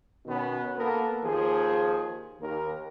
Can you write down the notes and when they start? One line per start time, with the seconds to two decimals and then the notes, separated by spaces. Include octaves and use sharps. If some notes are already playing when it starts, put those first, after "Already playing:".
0.26 B2 D#3 B3 C#4
0.77 A#3 B3 A4 A#4
1.24 D#2 F3 G#4
2.41 D#2 A#4